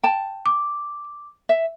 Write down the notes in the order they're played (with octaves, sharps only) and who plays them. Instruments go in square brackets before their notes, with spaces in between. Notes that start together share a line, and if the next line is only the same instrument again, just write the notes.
[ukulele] G5 A5
[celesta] D6
[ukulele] E5